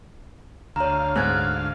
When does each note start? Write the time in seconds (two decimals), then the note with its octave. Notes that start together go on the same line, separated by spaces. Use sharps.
0.76 D2 C#5 F5 A#5
1.16 G#2 F6 F#6 G#6